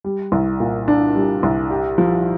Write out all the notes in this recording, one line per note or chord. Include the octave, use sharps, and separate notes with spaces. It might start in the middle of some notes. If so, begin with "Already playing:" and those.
G3
C2
A#2
D4
G3
C2
G4
F3